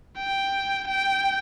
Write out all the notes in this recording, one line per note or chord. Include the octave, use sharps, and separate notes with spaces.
G5
G5